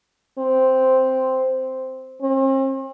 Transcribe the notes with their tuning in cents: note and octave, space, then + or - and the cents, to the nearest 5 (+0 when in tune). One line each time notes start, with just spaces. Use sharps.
C4 -5
C4 +45